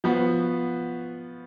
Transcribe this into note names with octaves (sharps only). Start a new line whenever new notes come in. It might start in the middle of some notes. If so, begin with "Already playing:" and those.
F3 B3 F#4